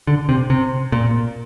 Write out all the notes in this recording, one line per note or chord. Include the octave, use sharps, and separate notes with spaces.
D3
C3
C3
A#2